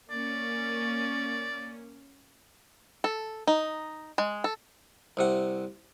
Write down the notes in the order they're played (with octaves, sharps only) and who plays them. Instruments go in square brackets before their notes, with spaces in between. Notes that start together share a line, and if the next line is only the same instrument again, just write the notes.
[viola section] A#3 C#4 [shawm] D5
[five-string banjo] A4
D#4
G#3
A4
[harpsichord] C2 C3 F#5